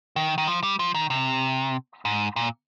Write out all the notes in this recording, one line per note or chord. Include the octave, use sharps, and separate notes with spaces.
D#3
D#3
F3
G3
F3
D#3
C3
G#2
A#2